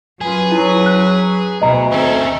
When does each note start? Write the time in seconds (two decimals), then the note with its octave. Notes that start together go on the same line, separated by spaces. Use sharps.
0.21 F#2 F4 G#4 B4
0.52 F#3 E4
0.86 F#6
1.62 D2 B2 D#5 A#5
1.92 D#3 C4 C#4 A4